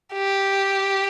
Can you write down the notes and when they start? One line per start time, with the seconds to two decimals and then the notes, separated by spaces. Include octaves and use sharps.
0.14 G4